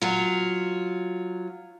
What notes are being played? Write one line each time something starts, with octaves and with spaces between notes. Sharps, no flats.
F#3 F4